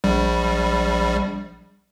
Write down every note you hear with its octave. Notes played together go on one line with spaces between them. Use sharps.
A#1 G3